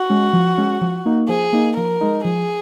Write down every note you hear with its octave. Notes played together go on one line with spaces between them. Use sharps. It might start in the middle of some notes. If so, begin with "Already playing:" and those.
Already playing: F#4
G#3 C#4
F3
G#3 C#4
F3
A#3 D#4
F3 G#4
A#3 D#4
F3 A#4
G#3 D#4
F3 G#4